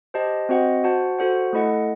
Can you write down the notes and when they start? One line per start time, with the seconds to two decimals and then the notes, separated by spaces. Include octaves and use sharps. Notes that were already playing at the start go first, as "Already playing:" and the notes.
0.14 G4 C5 D#5 A5
0.49 C4 F#4 C5 D#5 F#5
0.84 F#4 C5 F#5 A5
1.19 F#4 A4 C5 F#5
1.53 A3 E4 A4 D#5 F#5